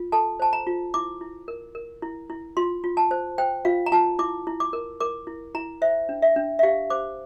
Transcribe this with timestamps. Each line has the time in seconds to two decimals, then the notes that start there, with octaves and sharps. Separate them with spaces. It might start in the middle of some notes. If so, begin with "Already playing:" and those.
Already playing: F4
0.12 A4 A5
0.40 C5 A5
0.53 A#5
0.67 F4
0.94 E4 D6
1.21 E4
1.48 A#4
1.75 A#4
2.02 E4
2.30 E4
2.57 F4 C6
2.84 F4
2.97 A5
3.11 C5
3.38 C5 G5
3.65 F4 F5
3.86 A#5
3.92 F4 A5
4.19 E4 D6
4.47 E4
4.60 D6
4.73 A#4
5.00 A#4 D6
5.27 E4
5.55 E4 A#5
5.82 C5 E5
6.09 D4
6.22 E5
6.36 D4
6.59 E5
6.63 G4 F5
6.90 C5 D6